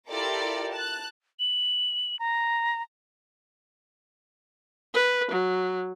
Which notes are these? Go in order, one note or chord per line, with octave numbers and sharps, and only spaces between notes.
E4 F4 G4 A4 A#4 D5
A5 F#6
F#7
A#5
B4
F#3